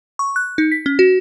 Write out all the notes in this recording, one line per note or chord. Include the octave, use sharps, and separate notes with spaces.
C#6
F#6
D#4
B6
C#4
F#4